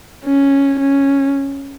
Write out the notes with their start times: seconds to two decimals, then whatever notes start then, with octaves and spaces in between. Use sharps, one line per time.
0.25 C#4
0.80 C#4